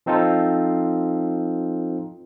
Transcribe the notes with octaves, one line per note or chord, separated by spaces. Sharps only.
F3 C4 D#4 F4 A4 C5